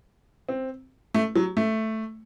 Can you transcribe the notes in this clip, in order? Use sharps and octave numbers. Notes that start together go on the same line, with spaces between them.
C4
A3
F#3
A3